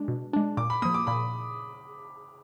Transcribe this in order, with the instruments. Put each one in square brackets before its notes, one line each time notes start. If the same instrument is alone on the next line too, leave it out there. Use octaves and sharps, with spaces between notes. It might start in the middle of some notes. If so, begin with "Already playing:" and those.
Already playing: [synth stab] G#3 D4
B2
G#3 D4
[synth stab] A#2 [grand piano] D6
[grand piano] B5
[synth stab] F3 A#3 [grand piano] D#6
[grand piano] D6
[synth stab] A#2 [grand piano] B5